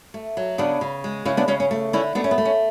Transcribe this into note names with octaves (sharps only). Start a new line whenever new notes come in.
A3
F#3
C#3 B3 D4
C#3
G#3
C#3 C#4 E4
B3 D4
C#3 C#4
C#4
A3
D3 C#4 E4
A3 B3 D4
C#4
B3
A3
C#4